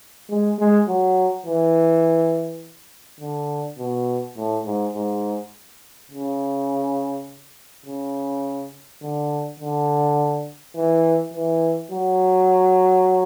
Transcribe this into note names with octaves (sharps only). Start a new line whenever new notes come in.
G#3
G#3
F#3
E3
D3
B2
A2
G#2
G#2
C#3
C#3
D3
D3
E3
E3
F#3